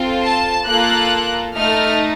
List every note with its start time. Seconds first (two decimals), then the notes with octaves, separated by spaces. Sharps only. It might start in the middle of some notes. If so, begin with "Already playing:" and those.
Already playing: C4 F4 A4
0.23 A5
0.66 A#3 F4 A4 F#6
1.56 A3 D#4 A4 F6